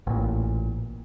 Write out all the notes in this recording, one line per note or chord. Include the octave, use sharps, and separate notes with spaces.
A1 A#2